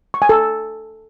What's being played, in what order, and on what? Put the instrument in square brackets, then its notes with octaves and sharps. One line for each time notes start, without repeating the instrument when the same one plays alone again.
[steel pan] C#6
G#5
A4